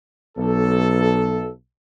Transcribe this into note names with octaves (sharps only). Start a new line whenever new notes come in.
B1 A4